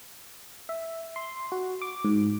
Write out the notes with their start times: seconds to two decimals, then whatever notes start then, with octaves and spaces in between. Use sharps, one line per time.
0.69 E5
1.16 C6
1.52 F#4
1.82 D6
2.05 G#2